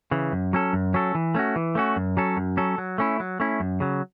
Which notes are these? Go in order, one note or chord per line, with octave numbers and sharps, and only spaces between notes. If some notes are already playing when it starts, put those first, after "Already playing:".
C#3 E3
F#2
F#3 C#4 A4
F#2
F#3 C#4 A4
E3
A3 C#4 F#4
E3
A3 C#4 F#4
F#2
F#3 C#4 A4
F#2
F#3 C#4 A4
F#3
A3 C#4 E4
F#3
A3 C#4 E4
F#2
C#3 F#3